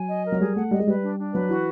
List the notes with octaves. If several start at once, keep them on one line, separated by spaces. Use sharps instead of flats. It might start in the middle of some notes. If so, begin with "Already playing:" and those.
Already playing: F#3 G#5
D#5
A#4
F#3
G3 G#4
A3 F#5
G3 D#5
G#3
G3 B4
D4
D4
F#3 B4
E3 F#4